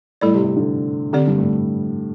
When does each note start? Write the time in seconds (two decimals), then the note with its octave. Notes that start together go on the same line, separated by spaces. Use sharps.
0.21 A2 G3 E4 A4 D5
0.34 C3
0.44 C3
0.56 D3
1.13 D3 C4 G4 D5
1.27 G2
1.38 A2